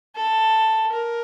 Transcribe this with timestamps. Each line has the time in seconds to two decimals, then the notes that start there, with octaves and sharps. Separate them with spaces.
0.16 A4
0.92 A#4